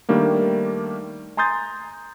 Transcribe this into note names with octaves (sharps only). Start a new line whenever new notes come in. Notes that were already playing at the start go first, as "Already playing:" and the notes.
D#3 G3 A3 A#3 D4
G#5 A#5 C6 D#6 G6 A6